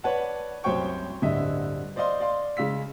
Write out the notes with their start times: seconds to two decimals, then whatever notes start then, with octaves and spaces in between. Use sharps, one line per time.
0.04 B4 C#5 D5 F#5 A5
0.64 C2 F#2 C5 C#5 G5 C#6
1.22 D1 G2 D3 D#5 E5
1.96 C5 D5 D#5 F5 C6
2.20 D5 F5 C6
2.57 C#3 G#3 F5 E6 B6